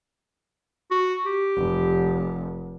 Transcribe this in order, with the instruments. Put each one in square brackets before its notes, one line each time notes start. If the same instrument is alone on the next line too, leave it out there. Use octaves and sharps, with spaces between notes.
[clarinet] F#4
G4
[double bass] F1